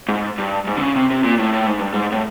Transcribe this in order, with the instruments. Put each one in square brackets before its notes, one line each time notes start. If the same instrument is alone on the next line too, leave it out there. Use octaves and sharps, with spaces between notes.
[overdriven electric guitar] G#2
G2
G#2
D3
C#3
C3
C3
A#2
A2
A2
G#2
G2
G#2
A2